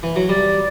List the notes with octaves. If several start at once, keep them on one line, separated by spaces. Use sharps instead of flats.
E3
F#3
G3 D5